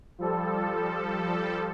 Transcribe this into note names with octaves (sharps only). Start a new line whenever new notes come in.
F3 G3 A4